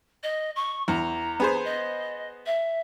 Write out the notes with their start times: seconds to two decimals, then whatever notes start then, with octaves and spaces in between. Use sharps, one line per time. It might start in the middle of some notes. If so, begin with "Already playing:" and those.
0.23 D#5
0.56 C#6
0.88 E2 A#5
1.40 B3 G#4 C5
1.65 D#5
2.46 E5